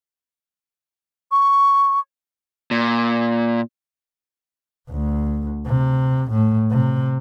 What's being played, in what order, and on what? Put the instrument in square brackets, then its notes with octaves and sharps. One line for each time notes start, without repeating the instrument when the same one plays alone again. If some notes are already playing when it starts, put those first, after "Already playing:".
[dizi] C#6
[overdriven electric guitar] A#2
[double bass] D2
C3
A2
C3